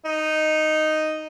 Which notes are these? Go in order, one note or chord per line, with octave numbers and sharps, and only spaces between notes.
D#4